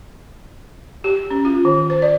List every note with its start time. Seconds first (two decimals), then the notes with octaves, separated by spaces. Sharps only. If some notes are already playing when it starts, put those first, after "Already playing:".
1.04 G4
1.31 C#4
1.45 F4
1.65 D#3
1.90 C5
2.02 D5